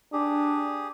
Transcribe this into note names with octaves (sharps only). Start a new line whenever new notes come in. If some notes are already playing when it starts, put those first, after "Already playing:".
D4 G4 G#4